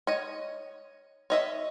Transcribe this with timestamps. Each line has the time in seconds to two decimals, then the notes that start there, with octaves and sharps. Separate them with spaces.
0.07 C#5 D#5
1.30 C#5 D#5 E5